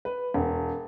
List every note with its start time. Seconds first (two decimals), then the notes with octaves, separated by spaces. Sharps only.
0.05 B4
0.34 E1